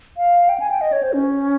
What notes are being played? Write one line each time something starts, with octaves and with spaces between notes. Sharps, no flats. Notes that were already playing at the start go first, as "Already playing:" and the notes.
F5
G5
G#5
G5
D#5
C#5
C5
C#4